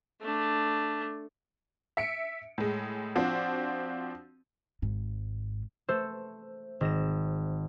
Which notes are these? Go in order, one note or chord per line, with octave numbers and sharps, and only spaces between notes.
A3 D4
E5 C#7 D7
A2 G#3
F3 C4 D4 F#4
G#1 G#2
A3 A4 C5
G#1 A#6 E7